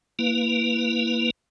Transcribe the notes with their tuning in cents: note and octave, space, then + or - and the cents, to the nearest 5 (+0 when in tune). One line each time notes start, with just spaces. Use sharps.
A#3 -5 E4 +0 B4 +0